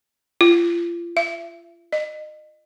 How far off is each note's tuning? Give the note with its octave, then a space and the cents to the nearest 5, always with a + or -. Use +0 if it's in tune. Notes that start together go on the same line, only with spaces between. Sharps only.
F4 -35
E5 +30
D#5 -30